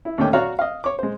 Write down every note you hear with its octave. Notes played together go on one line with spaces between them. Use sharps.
E4
D#2 D3 A3 C#4 G5 D6
F#4 C#5 D5 F5 A#5 F#6
D#5 F5
C#5 D6
G#3 C5